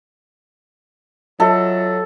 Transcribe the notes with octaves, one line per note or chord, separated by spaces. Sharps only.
F#3 F4 A4 D#5 E5